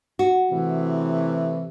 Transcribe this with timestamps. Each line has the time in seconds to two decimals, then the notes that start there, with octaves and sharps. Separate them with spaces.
0.19 F#4
0.51 A2 C3 E3